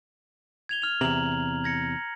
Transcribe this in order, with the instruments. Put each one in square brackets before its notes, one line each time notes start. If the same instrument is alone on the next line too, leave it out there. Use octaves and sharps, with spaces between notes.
[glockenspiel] G#6 F7 G7
F6 F7
[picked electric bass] E2 C3 [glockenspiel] A#5 F#7
[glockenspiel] G#6 A#6 C#7